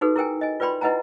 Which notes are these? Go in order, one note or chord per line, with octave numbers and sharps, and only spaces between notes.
D#4 F#4 G#4 A4 B4
E4 G#4 A#4 G5 G#5
D#5 G#5
F4 B4 D5 G5 B5 C6
E4 B4 D#5 F#5 G#5 A#5